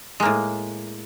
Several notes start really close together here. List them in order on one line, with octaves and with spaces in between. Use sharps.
G#3 A#3 A2